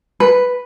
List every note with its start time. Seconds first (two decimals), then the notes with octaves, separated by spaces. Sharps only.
0.20 B4